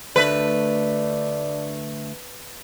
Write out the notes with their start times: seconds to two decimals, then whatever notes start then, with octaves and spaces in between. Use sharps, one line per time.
0.16 D2 A3 D4 B4